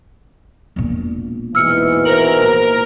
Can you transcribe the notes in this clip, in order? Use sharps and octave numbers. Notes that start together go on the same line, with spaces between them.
E1 A#2
G#2 B2 E3 E6 F6 C#7
A#4 C5 F#7
A#2